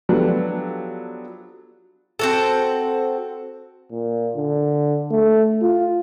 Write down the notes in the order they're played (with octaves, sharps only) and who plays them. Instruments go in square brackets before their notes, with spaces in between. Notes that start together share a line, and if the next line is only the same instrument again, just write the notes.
[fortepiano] F3 F#3 B3 D4 G4 A4
[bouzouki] C4 F#4 A4
[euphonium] A#2
D3
A3
F4